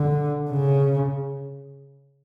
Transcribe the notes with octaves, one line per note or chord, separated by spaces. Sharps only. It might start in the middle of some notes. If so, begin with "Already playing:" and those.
Already playing: D3
C#3